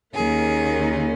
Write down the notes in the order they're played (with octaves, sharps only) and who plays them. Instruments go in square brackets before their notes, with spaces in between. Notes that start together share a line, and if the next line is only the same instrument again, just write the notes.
[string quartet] D#2 D#3 A#3 C#4 G#4